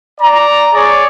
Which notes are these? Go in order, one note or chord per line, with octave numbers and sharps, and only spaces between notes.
D5 A#5
G#4 C#5 D5